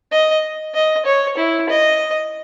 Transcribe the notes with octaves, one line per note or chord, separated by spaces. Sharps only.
D#5
D#5
C#5
E4
D#5